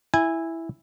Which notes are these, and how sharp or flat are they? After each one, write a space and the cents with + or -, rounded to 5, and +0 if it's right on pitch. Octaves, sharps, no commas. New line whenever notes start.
E4 +0 G#5 -15